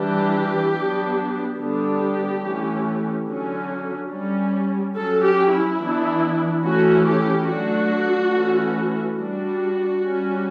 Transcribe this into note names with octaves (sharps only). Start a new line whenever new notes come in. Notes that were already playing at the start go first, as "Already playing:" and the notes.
Already playing: E3 G3 D4 G4
F#3 B3 D4
D3 G3 B3 D4 G4
E3 A3 C#4
D3 F#3 C#4
G3 C#4
F#3 C#4 A4
G4
E4
E3 B3 D4
E3 A3 C#4 F#4
G4
F#3 A3 D4 F#4
E3 A3 C#4
G3 D4 F#4
G3 C#4